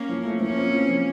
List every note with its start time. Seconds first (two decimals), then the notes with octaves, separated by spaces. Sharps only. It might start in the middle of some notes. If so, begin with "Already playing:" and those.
Already playing: A#3 C#4
0.09 F3
0.25 A3
0.40 F3 A#3 C#4
0.57 C4
0.72 F3
0.89 F3